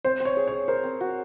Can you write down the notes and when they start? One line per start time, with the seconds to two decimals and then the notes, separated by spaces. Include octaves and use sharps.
0.04 C4 C5
0.20 C4
0.25 C#5
0.37 G#4
0.48 C#5
0.52 G#4
0.68 A#4 C5
0.84 C4
1.01 F#4